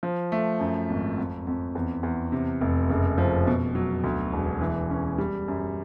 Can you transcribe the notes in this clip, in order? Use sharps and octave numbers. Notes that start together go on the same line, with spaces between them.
F3
A3
F#2
G#1
F2
F2
E2
E2
C3
F1
F#1
F3
B2
F#3
D2
E1
E3
C#4
G3
F#2